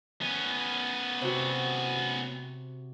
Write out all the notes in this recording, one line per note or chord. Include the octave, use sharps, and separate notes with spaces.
B3 C#4
C3 F#4